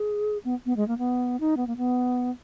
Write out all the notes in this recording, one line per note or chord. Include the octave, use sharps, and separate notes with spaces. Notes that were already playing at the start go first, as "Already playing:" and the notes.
Already playing: G#4
B3
B3
G#3
A#3
B3
D#4
B3
A#3
B3